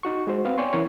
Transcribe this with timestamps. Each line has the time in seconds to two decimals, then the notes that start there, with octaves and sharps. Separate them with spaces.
0.03 D#4 F#4 C#6
0.27 G#3 F#4 C5
0.45 B3 C4 F5
0.58 C#5 D5 G5 G#5 C6 C#6
0.73 E3 B3 C#4 A#4 C#5